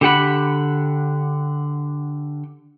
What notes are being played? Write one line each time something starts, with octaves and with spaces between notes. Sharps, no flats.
D3 G4 F#5 B5